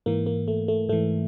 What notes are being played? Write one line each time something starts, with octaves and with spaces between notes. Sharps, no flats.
G#2 E3 A#3
A#3
A3
A3
G#2 E3 A3